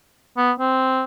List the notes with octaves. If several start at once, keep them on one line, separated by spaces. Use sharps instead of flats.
B3
C4